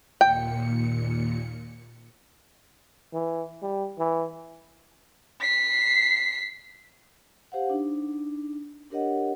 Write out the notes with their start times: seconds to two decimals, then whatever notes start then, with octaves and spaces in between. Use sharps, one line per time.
0.21 D#2 A#2 G5 C#7
3.13 E3
3.62 G3
3.99 E3
5.41 B6 C7
7.52 G4 C5 F5 F#5
7.70 D4 D#4
8.90 D4 G4 A#4 C#5 D#5 F#5